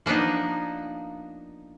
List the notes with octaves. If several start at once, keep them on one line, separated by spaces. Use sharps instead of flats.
F3 A#3 B3 D4 D#4